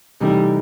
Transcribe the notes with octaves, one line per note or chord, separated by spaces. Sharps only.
C3 E3 G3 A3 D#4 A4